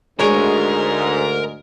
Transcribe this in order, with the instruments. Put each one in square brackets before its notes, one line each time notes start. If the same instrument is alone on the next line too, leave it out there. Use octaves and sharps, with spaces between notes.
[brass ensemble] D2 G#2 [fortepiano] G#3 [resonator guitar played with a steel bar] G#4 C#5 [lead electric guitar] A#4